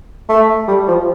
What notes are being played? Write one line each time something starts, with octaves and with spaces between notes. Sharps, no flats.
A3
G3
F3